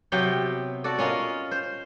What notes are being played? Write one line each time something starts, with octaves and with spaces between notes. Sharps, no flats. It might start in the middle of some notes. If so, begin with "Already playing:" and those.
C3 F#3 B3 G5
F#4 A4 D5
C#4 F4 A#4 D#5
C5